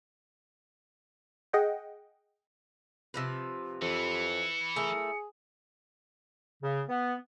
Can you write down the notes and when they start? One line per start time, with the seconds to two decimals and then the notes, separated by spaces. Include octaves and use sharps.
1.53 G#4 D#5 F#5 G5
3.14 C3 F3 B4
3.82 F2 E3 C#7
4.76 A3 E4 G#4 A#4
6.62 C#3
6.88 B3